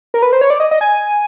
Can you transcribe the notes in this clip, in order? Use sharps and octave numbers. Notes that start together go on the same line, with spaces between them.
A#4
B4
C5
C#5
D5
D#5
D#5
G#5